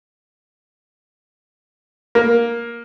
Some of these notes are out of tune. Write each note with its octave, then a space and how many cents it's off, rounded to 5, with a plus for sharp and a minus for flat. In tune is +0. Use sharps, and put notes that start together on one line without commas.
A#3 +10